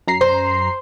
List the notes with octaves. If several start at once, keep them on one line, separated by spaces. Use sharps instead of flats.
F#2 A#5 C7
C5